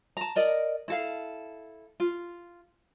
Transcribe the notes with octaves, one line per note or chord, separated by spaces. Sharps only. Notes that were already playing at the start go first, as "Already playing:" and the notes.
A5 A#5
A#4 D5 D#5
E4 A4 F5
F4